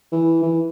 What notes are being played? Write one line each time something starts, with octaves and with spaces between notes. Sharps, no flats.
E3
E3